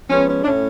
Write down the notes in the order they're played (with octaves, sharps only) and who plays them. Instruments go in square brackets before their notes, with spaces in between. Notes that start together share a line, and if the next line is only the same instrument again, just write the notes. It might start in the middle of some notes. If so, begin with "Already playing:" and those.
[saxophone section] F3 G#3 B3 C#4
C#4
D4
A2 C#4